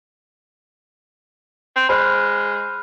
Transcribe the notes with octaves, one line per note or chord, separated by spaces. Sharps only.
C4
G#3 C5 B5 F6 F#6